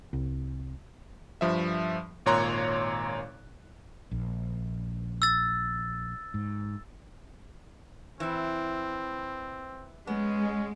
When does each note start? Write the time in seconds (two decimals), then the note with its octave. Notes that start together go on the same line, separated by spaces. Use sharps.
0.13 C2
1.41 G2 F3 E5
2.26 G#1 A#2 C#5 A#5 C6 F#6
4.11 A#1
5.22 E6 A6
6.34 G#2
8.20 E3 C4 E4
10.07 G#3 B3 C#4